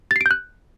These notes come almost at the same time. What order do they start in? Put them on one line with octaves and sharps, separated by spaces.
A6 C7 D7 G6 F#6